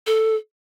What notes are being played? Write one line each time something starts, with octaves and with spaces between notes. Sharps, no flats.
A4